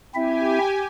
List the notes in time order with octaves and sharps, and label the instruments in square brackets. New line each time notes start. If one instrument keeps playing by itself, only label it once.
[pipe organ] C4 E4 E5 [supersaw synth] G4 G#5